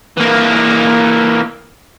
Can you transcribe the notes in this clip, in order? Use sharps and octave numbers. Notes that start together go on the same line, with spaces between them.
E3 A#3